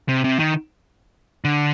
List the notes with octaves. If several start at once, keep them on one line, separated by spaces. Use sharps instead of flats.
C3
C3
D#3
D3